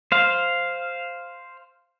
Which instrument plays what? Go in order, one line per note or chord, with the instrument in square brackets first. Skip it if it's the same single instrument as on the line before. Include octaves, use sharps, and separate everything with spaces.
[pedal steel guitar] C5 F5